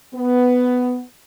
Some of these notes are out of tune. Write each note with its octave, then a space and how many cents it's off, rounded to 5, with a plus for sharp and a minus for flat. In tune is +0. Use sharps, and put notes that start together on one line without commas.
B3 +10